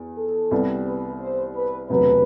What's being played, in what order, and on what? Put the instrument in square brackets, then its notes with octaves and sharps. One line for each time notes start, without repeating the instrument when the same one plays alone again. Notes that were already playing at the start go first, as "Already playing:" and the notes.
Already playing: [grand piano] E2
[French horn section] A4
[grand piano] C2 C3 G3 B3
[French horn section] B4
C5
B4
[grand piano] E1 D2 C3 F#3 [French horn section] B4